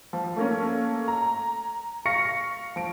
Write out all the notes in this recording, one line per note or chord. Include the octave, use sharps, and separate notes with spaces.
F3
A3 A#3 C#4
A#5
F5 C#6 A#6 C#7
F3 D7